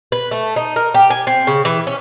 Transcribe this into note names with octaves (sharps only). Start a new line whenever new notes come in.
B4
A3
D#4
A#4
G4
G#5
C4
C#3
E3
C#4